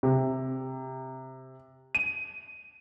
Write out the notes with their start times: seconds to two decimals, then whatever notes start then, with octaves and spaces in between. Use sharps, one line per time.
0.03 C3
1.95 D#7